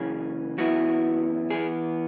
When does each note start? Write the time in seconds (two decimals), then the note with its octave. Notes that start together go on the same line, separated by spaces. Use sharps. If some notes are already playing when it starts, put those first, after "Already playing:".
Already playing: F#2 C#3 E3 C#4 G#4
0.58 F#2 E3 B3 E4 F#4
1.50 E3 B3 G#4